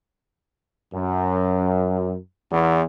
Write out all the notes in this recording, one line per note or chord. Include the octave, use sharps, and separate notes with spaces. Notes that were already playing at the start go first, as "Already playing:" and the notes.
F#2
E2